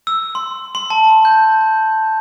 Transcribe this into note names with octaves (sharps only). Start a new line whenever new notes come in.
E6
C6
C6
A5
G6